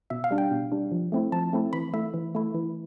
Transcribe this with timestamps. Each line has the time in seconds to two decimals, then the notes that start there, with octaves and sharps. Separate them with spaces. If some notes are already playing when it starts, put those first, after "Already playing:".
0.10 B2 E5
0.24 F5
0.31 G3 D4
0.38 G5
0.51 B2
0.72 G3 D4
0.92 F3
1.12 A3 C4 E4
1.32 F3 A5
1.53 A3 C4 E4
1.73 E3 B5
1.94 A3 E4 E5
2.14 E3
2.35 A3 E4
2.54 E3